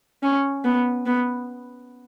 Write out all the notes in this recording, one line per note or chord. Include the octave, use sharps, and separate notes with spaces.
C#4
B3
B3